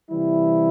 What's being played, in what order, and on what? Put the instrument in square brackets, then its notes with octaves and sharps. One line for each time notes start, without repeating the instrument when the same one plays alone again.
[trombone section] C3 E3 G3 E4